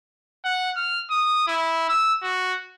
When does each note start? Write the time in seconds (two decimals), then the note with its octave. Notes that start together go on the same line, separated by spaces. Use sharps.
0.45 F#5
0.76 F6
1.11 D#6
1.48 E4
1.89 E6
2.23 F#4